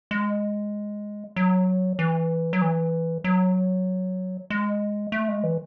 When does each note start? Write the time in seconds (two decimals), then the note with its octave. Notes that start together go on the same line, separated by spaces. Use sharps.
0.11 G#3
1.36 F#3
1.99 E3
2.53 F#3
2.62 E3
3.24 F#3
4.50 G#3
5.12 A3
5.28 G#3
5.43 E3